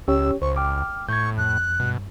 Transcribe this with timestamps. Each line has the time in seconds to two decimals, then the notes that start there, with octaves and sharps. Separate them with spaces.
0.08 C#2 C#4 G4 C#5 E6
0.42 C#2 C5 C#6
0.56 G5 D6 F6
1.09 A2 C#6 G6 G#6
1.38 F2 F#6
1.80 G2 B2